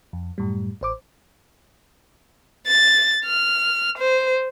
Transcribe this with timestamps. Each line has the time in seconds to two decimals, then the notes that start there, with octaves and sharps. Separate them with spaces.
0.13 F2
0.38 F#2 A2 G3
0.81 A1 C5 D6
2.67 A6
3.25 F6
3.98 C5